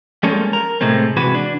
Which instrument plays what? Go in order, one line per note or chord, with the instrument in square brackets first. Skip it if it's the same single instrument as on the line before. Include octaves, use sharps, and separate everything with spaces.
[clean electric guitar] F3 G3 G#3 A#3 C#4 A4
A#4
A2 C3 G#3 A3 C4
C3 E3 G#3 F#4 B4
D4